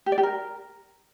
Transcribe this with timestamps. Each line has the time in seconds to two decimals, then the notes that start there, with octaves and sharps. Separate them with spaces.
0.06 G4
0.12 D5
0.18 G4
0.23 A#4